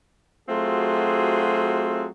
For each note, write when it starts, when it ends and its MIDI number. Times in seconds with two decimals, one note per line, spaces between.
0.49 2.08 54
0.49 2.08 57
0.49 2.08 60
0.49 2.08 65
0.49 2.08 66
0.49 2.08 68